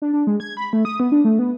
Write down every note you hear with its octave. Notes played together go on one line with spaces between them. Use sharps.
D4
D4
G#3
G#6
B5
A3
D#6
B3
D4
A3
B3